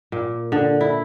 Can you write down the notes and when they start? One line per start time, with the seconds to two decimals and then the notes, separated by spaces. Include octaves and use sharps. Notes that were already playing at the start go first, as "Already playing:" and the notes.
0.12 A#2
0.52 D3
0.81 E4